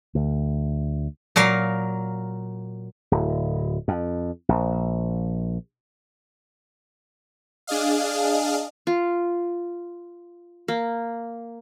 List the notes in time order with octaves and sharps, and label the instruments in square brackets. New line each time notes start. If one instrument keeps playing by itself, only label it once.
[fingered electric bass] D2
[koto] A#2 F#3 A#4 F5
[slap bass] D1
F2
A#1
[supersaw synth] D4 G#4 D#5 F5
[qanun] F4
A#3